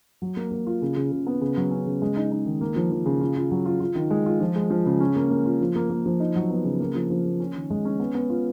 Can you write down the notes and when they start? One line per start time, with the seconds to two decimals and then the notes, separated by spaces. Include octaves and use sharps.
0.22 F#3
0.37 A#3
0.51 A#3
0.67 F4
0.82 C#3
0.96 C#3
1.12 C#3
1.27 B3
1.41 C#3
1.57 F#3
1.71 C#4
1.86 C#3
2.02 G#3
2.16 D#4
2.31 D#4
2.46 D#3
2.61 A#3
2.76 F3
2.91 F3
3.06 C#3
3.21 F4
3.36 F4
3.51 F#3
3.66 F4
3.80 F4
3.95 D#3
4.10 G#3
4.26 F4
4.40 F3
4.56 G#3
4.70 F3
4.86 C#3
5.00 C#4
5.16 A#3
5.30 A#3
5.45 F4
5.61 F3
5.76 A#3
5.90 A#3
6.06 F3
6.20 D#4
6.36 F#3
6.50 B3
6.65 C#3
6.80 A#3
6.95 F3
7.10 F3
7.25 A#3
7.40 C#4
7.55 D#3
7.70 G#3
7.85 C#4
8.00 B3
8.15 B3
8.30 F4